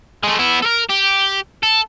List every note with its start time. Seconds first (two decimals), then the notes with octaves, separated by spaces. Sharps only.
0.24 G#3 A3
0.39 B3 E4
0.63 A4 A#4
0.90 G4
1.63 A4